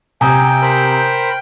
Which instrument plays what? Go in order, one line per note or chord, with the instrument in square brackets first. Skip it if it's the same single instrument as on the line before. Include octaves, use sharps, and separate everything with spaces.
[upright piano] C3 [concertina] G5 [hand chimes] G#5 A#5 D#6
[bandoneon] A#4 C5 B5